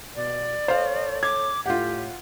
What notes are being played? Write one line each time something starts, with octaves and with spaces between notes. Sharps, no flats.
B2 D5
A4 C5 C#5 F5
D6 G#6
A2 F4 G4 F#5